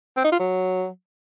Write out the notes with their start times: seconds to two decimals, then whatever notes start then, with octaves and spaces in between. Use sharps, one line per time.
0.17 C4
0.24 D#4
0.32 F4
0.40 F#3